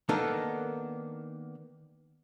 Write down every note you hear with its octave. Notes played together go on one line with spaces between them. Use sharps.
D#3 A#3 B3 D4 D#4 A4